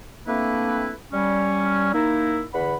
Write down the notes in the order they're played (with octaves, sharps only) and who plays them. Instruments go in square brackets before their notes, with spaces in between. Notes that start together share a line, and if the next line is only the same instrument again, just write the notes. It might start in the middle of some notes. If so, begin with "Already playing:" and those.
[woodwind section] A3 A#3 C4 D4 E4 B4
G3 C#4
A#3 D#4 E4
E2 D3 F#5 B5